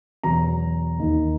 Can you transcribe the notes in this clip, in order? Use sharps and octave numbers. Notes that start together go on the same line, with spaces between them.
E2 B2 F#3 A#5
D#2 D#3 A#3 D#4